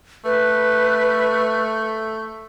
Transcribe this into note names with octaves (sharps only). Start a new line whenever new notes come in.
A3 B4